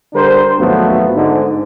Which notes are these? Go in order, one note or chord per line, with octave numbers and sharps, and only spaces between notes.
D3 G3 D4 A#4 C5
G#1 D2 F3 F#3 A3 B3
G#2 D3